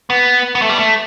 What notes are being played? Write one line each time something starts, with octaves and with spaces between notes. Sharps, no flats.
B3
B3
A3
G3
A3